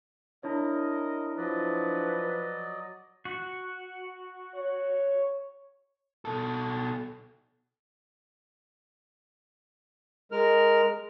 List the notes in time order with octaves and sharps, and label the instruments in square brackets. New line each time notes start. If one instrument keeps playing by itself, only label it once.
[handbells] D4 E4 C#5 [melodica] A#4 D#5
[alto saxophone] F3 [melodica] F#3 D5 D#5 [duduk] B4
[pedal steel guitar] F#4
[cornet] C#5
[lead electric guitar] B2 A4
[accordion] G#3 A#4 F6